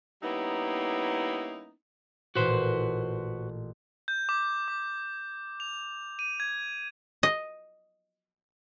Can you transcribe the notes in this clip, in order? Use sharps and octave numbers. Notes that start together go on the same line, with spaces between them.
G3 A#3 B3 C#4 D#4 E4
A1 A#2 F#4 B4 C5
G6
D6
D6
F7
D#7
G#6
D#5